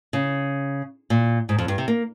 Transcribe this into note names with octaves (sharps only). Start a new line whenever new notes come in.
C#3
A#2
G#2
F2
G2
C3
A#3